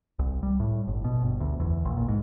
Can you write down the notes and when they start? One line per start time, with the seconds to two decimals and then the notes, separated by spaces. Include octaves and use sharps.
0.19 C2
0.43 G3
0.60 A2
0.88 G1
1.04 B2
1.23 G1
1.40 D2
1.60 E2
1.85 A#1
1.97 A#2
2.08 G#2